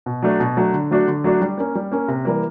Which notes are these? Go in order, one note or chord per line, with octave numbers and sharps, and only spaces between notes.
B2
F#3 A3 D4
B2
F#3 A3 D4
D3
F#3 A3 D4 F#4
D3
F#3 A3 D4 F#4
G3
A#3 C#4
G3
A#3 C#4
C3
E3 G3 A#3